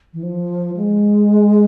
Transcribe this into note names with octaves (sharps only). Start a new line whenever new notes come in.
E3
F3
G#3